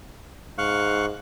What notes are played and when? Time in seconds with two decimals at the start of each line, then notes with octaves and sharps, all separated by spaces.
0.58 G#2 F5 C#6 F#6